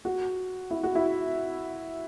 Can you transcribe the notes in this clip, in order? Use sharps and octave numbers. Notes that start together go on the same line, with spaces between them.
F#4
E4
F#4
E4